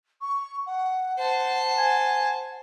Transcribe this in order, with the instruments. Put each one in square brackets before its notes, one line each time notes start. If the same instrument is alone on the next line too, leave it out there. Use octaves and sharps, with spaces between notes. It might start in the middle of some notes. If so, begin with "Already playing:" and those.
[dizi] C#6
F#5
[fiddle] C5 A5 [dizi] F#5
[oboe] G#5